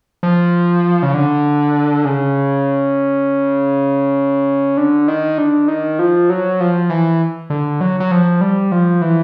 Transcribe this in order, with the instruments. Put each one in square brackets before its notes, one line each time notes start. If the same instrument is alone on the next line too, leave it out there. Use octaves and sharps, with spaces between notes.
[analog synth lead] F3
C#3
D3
C#3
D3
D#3
D3
D#3
F3
F#3
F3
E3
D3
F#3
F#3
F3
G3
F3
E3